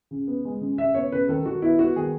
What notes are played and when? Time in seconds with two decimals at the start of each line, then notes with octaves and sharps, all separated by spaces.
0.11 C#3
0.27 B3
0.45 G#3
0.61 C#3
0.78 C#3 E5
0.94 B3 C#5
1.12 C#3 B4
1.29 D#3 A4
1.45 D#3 F#4
1.62 B3 E4
1.79 B3 F#4
1.96 D#3 G#4